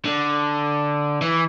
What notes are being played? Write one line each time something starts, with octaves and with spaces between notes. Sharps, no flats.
D3
E3